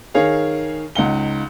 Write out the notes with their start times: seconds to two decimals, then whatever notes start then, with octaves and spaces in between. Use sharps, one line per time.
0.15 D#3 G#4 C#5 F5
0.95 C#2 D#4 F#5 G7